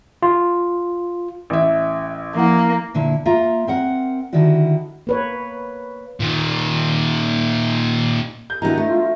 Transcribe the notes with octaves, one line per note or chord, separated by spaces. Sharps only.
F4
A1 E5
F3 A#3 E4 F#5
A#2 D3 A#3 E4
A#3 F4 E5 A#5
C4 A#4 F#5
D3 D#3 G3 E4 F#4
A#3 B4 C#5
A#2 D#3
G6
D#3 E3 F#3 B3 D4 E4 A#5
A3
F4